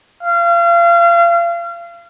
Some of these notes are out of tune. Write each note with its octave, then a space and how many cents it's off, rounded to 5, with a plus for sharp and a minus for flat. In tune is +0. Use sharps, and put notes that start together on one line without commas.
F5 -35